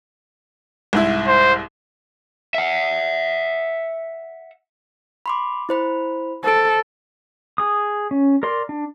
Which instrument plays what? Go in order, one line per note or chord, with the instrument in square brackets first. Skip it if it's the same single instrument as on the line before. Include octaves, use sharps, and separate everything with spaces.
[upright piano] C2 G#2 E4
[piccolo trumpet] C5
[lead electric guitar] E5 F#5
[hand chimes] B5 C6 D6
E4 C5 B5
[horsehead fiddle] A4 [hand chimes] C5 D7
[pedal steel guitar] G#4 D#6
C#4
A#4 D5 C6
D4